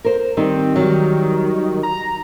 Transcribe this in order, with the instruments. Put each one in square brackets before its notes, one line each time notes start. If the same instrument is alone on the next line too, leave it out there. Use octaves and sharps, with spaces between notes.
[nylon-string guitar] A#4 C5
[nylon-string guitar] D#3 G3 D#4 [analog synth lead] C4
[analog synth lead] D#3 [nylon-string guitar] F#3 G3
[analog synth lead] A#5